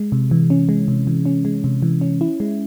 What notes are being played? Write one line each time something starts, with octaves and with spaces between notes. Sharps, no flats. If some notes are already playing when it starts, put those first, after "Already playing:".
Already playing: G#3
C3
E3
C#4
G#3
C3
E3
C#4
G#3
C3
E3
C#4
E4
G#3